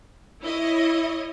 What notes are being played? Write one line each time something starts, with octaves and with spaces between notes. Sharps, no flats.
E4 C#5 D#5